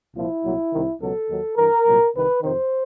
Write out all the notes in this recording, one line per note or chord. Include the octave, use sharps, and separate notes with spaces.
C2 A#2 F3 E4
C2 A#2 F#3
C2 C3 D#3
C#2 B2 F#3 A4
D#2 D#3 F#3
G2 E3 A#4
C2 A#2 F#3
C2 C3 D#3 B4
F2 C3 D#3 C5